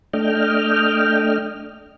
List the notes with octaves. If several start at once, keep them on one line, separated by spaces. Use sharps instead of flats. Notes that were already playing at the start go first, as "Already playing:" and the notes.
A3 D4 D#5 G5 F6